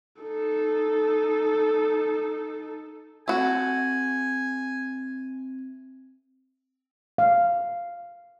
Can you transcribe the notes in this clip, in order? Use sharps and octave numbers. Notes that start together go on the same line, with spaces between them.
D#4 A4
A3 C4 F#4 G#5
F5